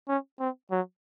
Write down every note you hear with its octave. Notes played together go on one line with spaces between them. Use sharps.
C#4
C4
F#3